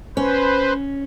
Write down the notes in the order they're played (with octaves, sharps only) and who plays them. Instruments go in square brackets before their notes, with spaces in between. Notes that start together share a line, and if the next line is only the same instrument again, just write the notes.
[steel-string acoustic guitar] C#4 [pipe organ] B4 C5